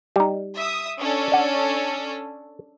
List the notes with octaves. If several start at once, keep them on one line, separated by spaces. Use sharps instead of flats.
G3 D#4
E5 D#6
C#4 D4 A4
D5 F#5